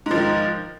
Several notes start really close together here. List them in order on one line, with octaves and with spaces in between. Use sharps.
G#2 F3 D#3